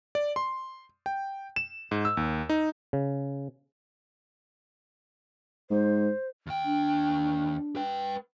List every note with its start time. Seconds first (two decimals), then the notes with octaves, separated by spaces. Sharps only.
0.15 D5
0.36 C6
1.06 G5
1.56 E7
1.91 G#2
2.05 E6
2.17 D#2
2.49 D#4
2.93 C#3
5.71 G#2 C5
6.47 D#2 G5
6.65 D4
7.76 B4 G5